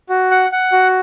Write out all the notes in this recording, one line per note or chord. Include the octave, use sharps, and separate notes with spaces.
F#4
F#5
F#5
F#4